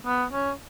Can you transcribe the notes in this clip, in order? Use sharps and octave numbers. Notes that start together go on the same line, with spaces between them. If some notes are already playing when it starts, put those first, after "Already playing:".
B3
C#4